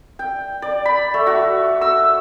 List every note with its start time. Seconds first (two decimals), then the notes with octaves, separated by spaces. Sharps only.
0.19 G5
0.62 D5
0.85 B5
1.14 A3
1.27 F#4
1.81 E6